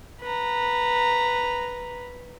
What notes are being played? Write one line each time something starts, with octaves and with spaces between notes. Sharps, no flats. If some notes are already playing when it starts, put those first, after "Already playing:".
B4 A#5